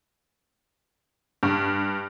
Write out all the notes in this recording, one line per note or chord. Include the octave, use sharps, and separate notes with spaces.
G2